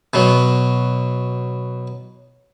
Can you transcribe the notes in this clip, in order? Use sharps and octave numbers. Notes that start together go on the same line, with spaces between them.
B2 F#3